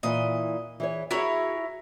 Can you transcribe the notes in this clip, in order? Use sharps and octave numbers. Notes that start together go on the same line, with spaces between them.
A#2 E3 D#5
E3 G#4 C#5
E4 F#4 G#4 A#4 C#5